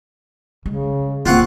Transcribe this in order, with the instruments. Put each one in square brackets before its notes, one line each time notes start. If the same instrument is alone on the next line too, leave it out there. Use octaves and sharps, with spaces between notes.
[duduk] C#3 [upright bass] G#3
[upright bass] D1 A#3 [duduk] C4 [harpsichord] F4 F#5 C#6